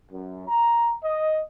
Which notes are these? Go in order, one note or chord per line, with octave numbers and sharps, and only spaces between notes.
F#2
A#5
D#5